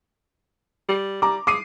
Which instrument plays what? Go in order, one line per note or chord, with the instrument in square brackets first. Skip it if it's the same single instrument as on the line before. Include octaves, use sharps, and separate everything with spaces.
[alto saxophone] G3
[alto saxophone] G3 [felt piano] A#5 D6
[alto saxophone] G#3 [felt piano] D6 C7 D#7